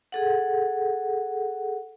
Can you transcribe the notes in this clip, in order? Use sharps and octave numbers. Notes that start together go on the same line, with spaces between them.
G#4 A4 F#5